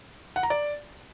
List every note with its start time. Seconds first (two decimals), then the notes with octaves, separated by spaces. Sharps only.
0.36 F#5
0.43 A#5
0.50 D5